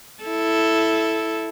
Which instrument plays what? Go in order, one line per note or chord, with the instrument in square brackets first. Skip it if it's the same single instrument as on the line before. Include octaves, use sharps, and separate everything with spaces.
[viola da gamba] E4 A4